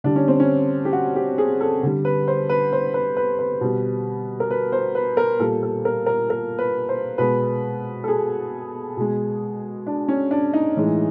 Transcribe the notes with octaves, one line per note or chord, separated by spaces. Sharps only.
D3 G3 D4
C#4
C4
C#4
G4
F#4
G4
G#4
A4
D3 G3
B4
C5
B4
C5
B4
B4
B4
B2 G3
A#4
B4
C5
B4
A#4
A#2 G3 A4
A4
A#4
A#4
A#4
B4
C5
B2 G#3 B4
A4
G#4
B2 G#3
D4
C#4
D4
D#4
A2 E3 G#3